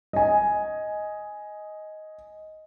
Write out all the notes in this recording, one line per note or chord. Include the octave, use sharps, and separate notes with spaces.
D#5 G#5